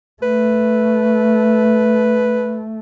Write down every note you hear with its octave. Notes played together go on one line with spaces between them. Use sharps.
A3 B4